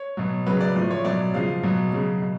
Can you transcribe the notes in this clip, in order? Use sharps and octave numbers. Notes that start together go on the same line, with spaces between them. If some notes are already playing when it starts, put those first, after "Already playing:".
Already playing: C#5
B2 F#3
C#3 F#3 B4
D5
A2 F3 D5
C#5
B2 F#3 D5
C#3 F3 F5
B2 F#3
C#3 F#3
B2